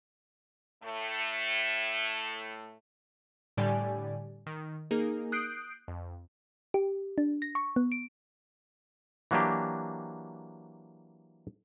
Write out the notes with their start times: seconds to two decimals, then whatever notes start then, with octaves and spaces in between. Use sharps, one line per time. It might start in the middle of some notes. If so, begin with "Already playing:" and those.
0.83 A2 A3
3.57 A2 D3 G3 G4 D5 G#5
4.46 D#3
4.91 A#3 D#4 G#4 A#4
5.32 D#6 F#6 G6 C7 D7
5.88 F2
6.74 G4
7.18 D4
7.42 A#6
7.55 C#6
7.76 B3
7.92 D7
9.31 E3 F#3 A#3 D4 G4